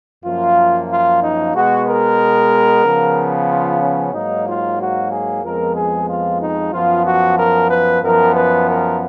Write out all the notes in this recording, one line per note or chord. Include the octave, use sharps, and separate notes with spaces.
F#2 F3 A#3 F4
F4
D#4
B2 G#3 B3 F#4
A#4
C#3 F3 B3
F4
C#4
G#2 F#3 A#3 D#4
F4
F#4
G#4
F2 F3 G#3 B3 A#4
G#4
F4
D#4
F#2 F3 B3 F4
F#4
A#4
B4
F#2 F3 B3 A#4
B4
A#4